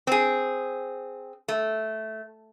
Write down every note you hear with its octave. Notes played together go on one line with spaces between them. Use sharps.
C4 G#4
A3